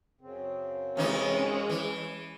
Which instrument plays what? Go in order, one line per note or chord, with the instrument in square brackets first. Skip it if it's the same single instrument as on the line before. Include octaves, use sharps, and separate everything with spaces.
[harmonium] F#2 C#3 C4
[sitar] C3 E3 D#4 [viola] G#3 C#4
[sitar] E3